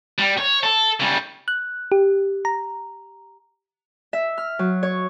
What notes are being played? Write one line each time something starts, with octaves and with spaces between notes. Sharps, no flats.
G3
C#5
A4
C#3 G3
F#6
G4
A#5
E5
F6
F#3
C#5